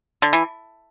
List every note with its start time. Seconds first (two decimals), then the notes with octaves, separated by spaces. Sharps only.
0.22 D3
0.33 E3